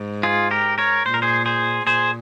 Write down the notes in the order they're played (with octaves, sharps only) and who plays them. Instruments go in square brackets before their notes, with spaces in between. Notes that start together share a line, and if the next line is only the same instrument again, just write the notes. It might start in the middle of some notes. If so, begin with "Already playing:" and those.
Already playing: [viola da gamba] G#2
[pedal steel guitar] F4 G#4
G4 A#4
A#4 C#5
[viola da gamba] A#2 [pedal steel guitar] C5
[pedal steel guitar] A#4
G#4 C5
G#4 C5
[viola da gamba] A#2 [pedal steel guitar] G#4 C5